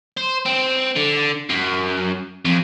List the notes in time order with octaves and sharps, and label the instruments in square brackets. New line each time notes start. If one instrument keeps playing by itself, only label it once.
[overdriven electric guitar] C5
C4
D3
F#2
F2